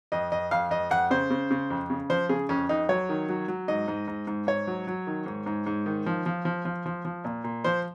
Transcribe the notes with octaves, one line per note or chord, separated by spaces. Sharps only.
F2 D#5
F2 D#5
F2 F5
F2 D#5
F2 F#5
C#3 C5
C#3
C#3
F2
C#3
F3 C5
C#3 G#4
F2 C#4
F2 D#4
F#3 C#5
D#3
F#3
F#3
G#2 D#5
G#2
G#2
G#2
G#2 C#5
F#3
F#3
D#3
G#2
G#2
G#2
D#3
F3
F3
F3
F3
F3
F3
A#2
A#2
F3 C5